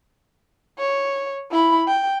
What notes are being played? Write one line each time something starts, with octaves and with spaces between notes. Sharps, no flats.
C#5
E4 B5
G5